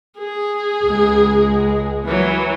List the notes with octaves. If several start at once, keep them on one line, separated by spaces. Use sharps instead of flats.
G#4
C#2 G#3
E3 F#3